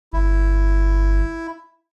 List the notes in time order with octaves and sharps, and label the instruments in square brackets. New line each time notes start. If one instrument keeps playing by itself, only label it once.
[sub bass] G1 [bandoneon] E4